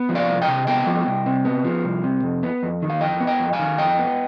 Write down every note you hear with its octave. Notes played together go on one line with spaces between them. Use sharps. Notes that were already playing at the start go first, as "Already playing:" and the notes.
Already playing: B3
F3
D5 F5
C2
D#5 G5
C3
B3 D#5 G5
F3
C2
C3
B3
F3
C2
C3
F2
B3
F2
D#3
F5
F2 D#5 G5
B3
D#5 G5
F2
F5 G#5
D#3
F2 D#5 G5
B3